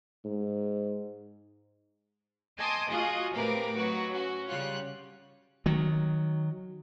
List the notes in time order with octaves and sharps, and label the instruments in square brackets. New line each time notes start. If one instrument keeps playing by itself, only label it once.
[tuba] G#2
[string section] D#5 G#5 A5 C6 D6 D#6
F4 F#4 G#4 D#5
A2 C3 A#4 B4 F5 D6
F#3 D#4 F#4 B4
C#4 F#4
C#3 G3 F4 C#5 F#6
[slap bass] D#3 F#3